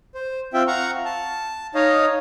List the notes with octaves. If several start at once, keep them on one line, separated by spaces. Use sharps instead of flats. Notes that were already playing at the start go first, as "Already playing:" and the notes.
C5
C4 F4 E5 G5
F5 F#5 A#5 C#6
A5
D#4 C#5 D#5 F5